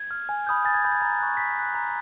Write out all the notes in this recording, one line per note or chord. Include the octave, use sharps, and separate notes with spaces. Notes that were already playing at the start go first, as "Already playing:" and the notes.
Already playing: G#6
F6
G#5
B5 D#6 G6
G#5 A6
G#6
B5 D#6 G6
G#6
A#5 A6
C#6 F#6
A#5 B6
C#6 F#6
A#5